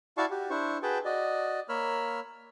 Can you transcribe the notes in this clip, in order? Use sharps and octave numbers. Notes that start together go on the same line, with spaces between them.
E4 F#4 D5 F5 A5 C#6
F#4 G4
D4 E4 C5 C#6
F#4 G#4 B4 G5 A5
F#4 D5 D#5
A#3 A#4 C#5 B5 E6 F6